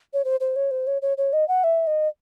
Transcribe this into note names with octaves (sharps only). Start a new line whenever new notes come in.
C#5
C5
C5
C#5
C5
C#5
C#5
C#5
D#5
F#5
E5
D#5